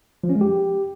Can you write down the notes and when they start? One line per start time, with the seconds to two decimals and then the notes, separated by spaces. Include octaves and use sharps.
0.24 F3
0.29 C#4
0.35 G#3
0.41 G4